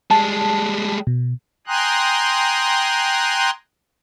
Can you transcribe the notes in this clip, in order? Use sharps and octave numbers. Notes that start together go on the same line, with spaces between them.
G3 G#3 A5
B2
G5 G#5 A#5 C6 D#6 F#6